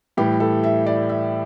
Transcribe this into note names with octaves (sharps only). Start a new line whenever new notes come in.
A2 E3 G3 G4
A4
E5
D5
E5